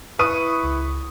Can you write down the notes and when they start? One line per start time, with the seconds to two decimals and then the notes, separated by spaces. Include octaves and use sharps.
0.19 E4 B4 C#6 D#6 D#7
0.64 C#2